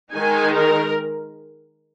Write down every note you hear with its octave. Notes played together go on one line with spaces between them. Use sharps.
D#3 G#3 D#4 G#5
A#4